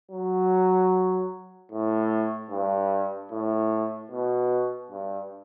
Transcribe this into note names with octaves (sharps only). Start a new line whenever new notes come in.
F#3
A2
G2
A2
B2
G2